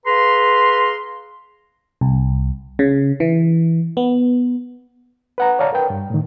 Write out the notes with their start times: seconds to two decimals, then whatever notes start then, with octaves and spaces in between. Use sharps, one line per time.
0.06 G#4 B4 F5 A#5 C6
2.01 C2
2.79 C#3
3.20 E3
3.97 B3
5.38 B4 F#5 A#5
5.59 C#5 D5 F5 A5 A#5
5.73 A#4 B4 G5
5.90 G2
6.10 A2 D#3